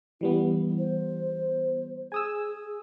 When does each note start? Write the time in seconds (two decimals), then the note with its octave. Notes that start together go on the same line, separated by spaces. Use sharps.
0.21 E3 G3 B3 E4
0.78 C5
2.12 G#4 G#5 D#6 E6